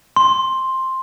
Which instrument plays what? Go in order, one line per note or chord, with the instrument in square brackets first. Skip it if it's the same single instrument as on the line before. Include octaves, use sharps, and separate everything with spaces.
[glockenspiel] C6